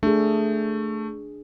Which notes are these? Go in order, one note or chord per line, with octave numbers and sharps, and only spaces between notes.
A3 D4 G#4